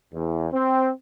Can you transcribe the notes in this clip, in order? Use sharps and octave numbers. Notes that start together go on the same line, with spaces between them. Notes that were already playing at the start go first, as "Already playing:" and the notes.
E2
C4